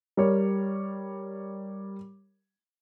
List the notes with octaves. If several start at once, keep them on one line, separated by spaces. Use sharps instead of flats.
G3 A#4 C#5